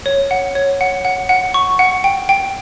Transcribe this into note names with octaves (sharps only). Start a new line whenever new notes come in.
C#5
F#5
C#5
F#5
F#5
F#5
C#6
F#5
G5
G5